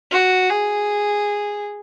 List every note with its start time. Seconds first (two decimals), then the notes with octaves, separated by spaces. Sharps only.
0.11 F#4
0.50 G#4